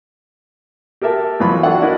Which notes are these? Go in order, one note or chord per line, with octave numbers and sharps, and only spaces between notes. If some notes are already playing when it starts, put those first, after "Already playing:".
G4 A4 A#4 E5 A5
F2 E3 F#3 F4 B5
D4 F4 F#4 A4 F#5
D4 E4 A#4 D#5